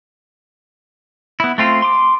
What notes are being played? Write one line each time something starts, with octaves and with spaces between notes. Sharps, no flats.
B3 E4
A3 C4 F4
C6 D6